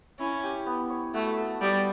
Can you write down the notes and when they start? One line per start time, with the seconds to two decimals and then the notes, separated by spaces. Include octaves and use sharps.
0.19 C#4 E4
0.44 G4
0.66 B3
0.90 C#5
1.14 A3 F#4
1.38 A4
1.61 G3 B3